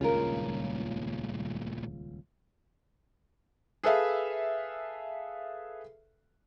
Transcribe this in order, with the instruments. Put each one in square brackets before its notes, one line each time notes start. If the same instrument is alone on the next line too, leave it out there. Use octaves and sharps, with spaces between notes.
[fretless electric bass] D#1 C#2 C#3 [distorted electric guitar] G2 A#2 [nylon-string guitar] F4 A#4
[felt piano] G#4 A4 B4 E5 F5